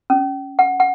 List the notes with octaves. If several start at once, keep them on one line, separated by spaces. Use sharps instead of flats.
C#4
F#5
F#5